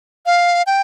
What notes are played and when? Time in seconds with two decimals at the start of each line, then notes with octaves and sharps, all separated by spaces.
0.26 F5
0.67 G5